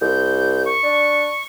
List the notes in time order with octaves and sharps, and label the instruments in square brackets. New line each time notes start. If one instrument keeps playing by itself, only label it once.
[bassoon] C2 [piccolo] G6
[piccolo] C#6
[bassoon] D4